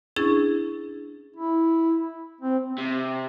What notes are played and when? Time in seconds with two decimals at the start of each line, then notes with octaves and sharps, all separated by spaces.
0.16 C#4 D4 E4 G#4 C#6 A6
1.36 E4
2.41 C4
2.78 C3